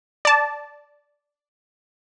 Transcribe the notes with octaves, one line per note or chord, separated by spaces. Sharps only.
D5 A5